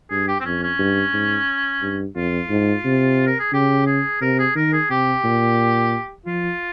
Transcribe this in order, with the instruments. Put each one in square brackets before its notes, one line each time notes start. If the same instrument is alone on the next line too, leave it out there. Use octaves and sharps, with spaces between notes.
[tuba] G2 [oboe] G#4
[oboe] G4
C4
[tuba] F2 [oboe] C#4
[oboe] C#4
[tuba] G2
G#2
G2
[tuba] F2 [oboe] F4
[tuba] G#2
C3
[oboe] A#4
G#4
[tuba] C#3 [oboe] G4
[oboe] G#4
[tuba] C3 [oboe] A#4
[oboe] G#4
[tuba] D#3 [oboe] A#4
[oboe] G#4
[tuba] C3 [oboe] G4
[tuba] A#2
[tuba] F3 [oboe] F4